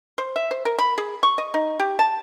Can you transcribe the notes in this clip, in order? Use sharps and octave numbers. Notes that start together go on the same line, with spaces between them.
C5
E5
C5
A#4
B5
G#4
C#6
D#5
D#4
G4
A5